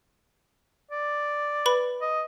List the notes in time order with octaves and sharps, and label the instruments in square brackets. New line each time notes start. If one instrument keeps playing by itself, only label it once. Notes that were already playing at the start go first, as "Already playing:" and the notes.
[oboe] D5
[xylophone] B4 B5
[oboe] D#5